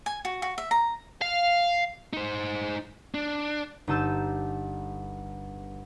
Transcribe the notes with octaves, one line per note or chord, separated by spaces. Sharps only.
G#5
F#4
F#4
E5
A#5
F5
D#4 C5
D4
G1 D#4 A5 E6 G6